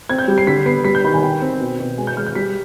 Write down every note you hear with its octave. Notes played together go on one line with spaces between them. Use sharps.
C4 G#6
G6
G3
C7
D3 B6
B3 C7
G3 B6
G6
D#3 B5
G#5
D#3 G5
C4
B2
B2
G#3 G#5
G6
G#3 F6
G6
G3 B6